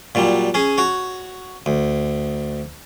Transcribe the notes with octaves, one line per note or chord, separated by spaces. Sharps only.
A#2 F#3 G3
C#4 G#4
F#4 C#5
D2